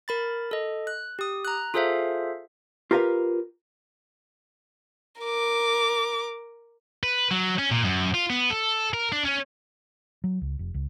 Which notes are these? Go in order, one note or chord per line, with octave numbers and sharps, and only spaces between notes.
A#4 B5 A6
A4 D#5
F#6
G4 D#6
A#5 F#6
F4 G#4 A4 C5 E5 F5
F4 G4 A#4 B4 F5
A#4 D6
B4
F#3
C#4
A#2
F#2
F4
B3
A4
A#4
D4
C#4
F#3
C#2
F1
C#2